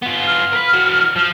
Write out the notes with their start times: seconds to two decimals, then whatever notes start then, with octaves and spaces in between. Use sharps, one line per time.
0.02 B3 F4
0.27 F6
0.52 A#4 B4
0.73 E3 F#4
1.16 F3 F6